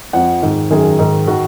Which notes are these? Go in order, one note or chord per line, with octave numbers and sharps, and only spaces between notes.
F2 F3 F#5
G#2 D#3
F#2 D#3 G#4
G#2 D#3
D#3 F#4